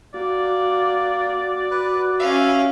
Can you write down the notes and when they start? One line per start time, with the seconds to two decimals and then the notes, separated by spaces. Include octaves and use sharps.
0.14 A#3 F#4 D5
1.71 B4
2.19 C#4 E5 F5